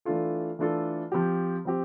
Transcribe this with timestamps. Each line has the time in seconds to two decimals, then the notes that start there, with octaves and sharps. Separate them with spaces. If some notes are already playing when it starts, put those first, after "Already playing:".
0.05 E3 A3 D4 F4 A4
0.59 E3 A3 D4 F4 A4
1.12 F3 C4 G4
1.65 F3 C4 G4